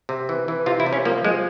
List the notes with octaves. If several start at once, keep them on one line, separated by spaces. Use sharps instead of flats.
C3
E3
E3
C3 F4
E4
C3
C#4
F3 A#3
F3 G#3